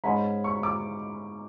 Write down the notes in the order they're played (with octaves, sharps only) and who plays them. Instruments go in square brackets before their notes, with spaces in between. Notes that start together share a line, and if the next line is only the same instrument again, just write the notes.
[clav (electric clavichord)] G#2 G#3 C#4 [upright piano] B5
[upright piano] C#6
D6